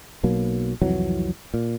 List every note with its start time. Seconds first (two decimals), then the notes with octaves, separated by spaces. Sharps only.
0.23 B1 B2 F#3 A#3
0.82 C2 F2 E3 F#3
1.54 A#2